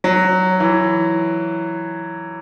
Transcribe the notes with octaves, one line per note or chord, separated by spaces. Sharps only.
F#3
E3